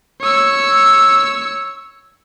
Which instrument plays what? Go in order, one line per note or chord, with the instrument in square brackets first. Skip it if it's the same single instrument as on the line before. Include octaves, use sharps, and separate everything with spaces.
[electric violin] C#5 E6